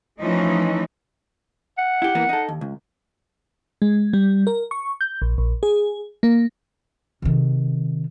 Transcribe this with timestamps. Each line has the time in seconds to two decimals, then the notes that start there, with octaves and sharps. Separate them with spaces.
0.19 E3 F3 A3 C#4 D#4
1.78 F#5
2.02 E4 G4
2.15 E3 A#3 B3
2.29 D#4 A4
2.49 D#2
2.61 C#2
3.82 G#3
4.13 G3
4.47 A#4
4.71 C#6
5.01 G6
5.22 A#1
5.38 A#1
5.63 G#4
6.23 A#3
7.22 C3 D#3